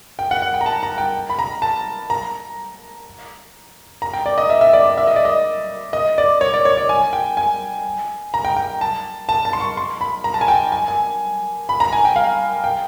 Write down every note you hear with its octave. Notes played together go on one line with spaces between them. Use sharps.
G5
F#5
F#5
G5
A#5
A5
A#5
G5
B5
A#5
A5
A#5
A#5
G5
D5
D#5
E5
E5
D5
D5
E5
D#5
D5
D#5
D#5
D5
C#5
D5
C#5
D5
G#5
G5
G#5
A#5
G5
G5
A5
A5
A5
C6
C#6
C6
B5
A#5
A5
G#5
G5
G#5
G#5
B5
A#5
G#5
G5
F5
G5